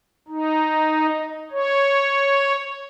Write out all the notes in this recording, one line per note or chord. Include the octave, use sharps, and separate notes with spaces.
D#4
C#5